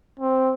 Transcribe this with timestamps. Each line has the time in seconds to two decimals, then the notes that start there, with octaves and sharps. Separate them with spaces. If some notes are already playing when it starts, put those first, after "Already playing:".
0.19 C4